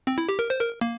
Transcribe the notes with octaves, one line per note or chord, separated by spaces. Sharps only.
C4
E4
G4
A#4
C5
A#4
A#3